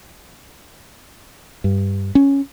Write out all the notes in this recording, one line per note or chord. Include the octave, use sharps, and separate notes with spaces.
G2
C#4